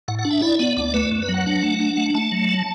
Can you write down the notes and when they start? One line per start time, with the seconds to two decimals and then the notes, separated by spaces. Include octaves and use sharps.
0.08 A2 F#5
0.19 F#5
0.25 D4
0.31 E5
0.42 E4 D5
0.59 B3 D5
0.77 D2 D5
0.94 A3 B4
1.11 F#2
1.22 B4
1.29 F#3
1.34 F#5
1.46 D4
1.63 A3
1.80 D4
1.97 A3
2.14 A3 A5
2.32 F#3
2.49 A5